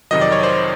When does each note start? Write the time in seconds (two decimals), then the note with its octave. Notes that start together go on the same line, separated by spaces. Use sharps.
0.11 F2 C3 D#3 F#3 D#5
0.21 D5
0.32 C#5
0.43 C5 D5